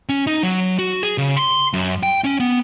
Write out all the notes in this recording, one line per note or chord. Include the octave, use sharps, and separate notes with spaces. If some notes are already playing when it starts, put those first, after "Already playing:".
C#4
D#4
F#3
F#4
G#4
C#3
C6
F#2
G5
C#4
B3